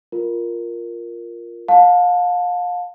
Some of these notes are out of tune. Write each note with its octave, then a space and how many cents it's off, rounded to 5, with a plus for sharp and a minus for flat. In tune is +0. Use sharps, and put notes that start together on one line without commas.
F4 +0 A#4 +0
F5 +30 A5 +0